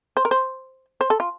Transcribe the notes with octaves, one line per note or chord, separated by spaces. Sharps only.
C5
A#4
C5
C5
A4
F4